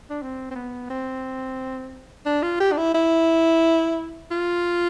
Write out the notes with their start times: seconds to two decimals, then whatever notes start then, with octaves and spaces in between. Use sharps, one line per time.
0.10 D4
0.22 C4
0.51 C4
0.55 B3
0.90 C4
2.26 D4
2.43 F4
2.60 G4
2.72 D4
2.77 E4
2.94 E4
4.31 F4